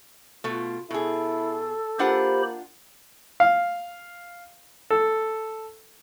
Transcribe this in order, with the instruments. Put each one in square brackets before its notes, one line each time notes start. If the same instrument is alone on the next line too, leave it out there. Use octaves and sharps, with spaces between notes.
[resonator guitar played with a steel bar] B2 A3 [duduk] F4
[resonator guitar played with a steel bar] B2 G#4 [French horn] E4 [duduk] A4
[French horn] A#3 [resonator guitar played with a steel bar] D4 F4 F#5 [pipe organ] G4 C5 B5
[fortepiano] F5
A4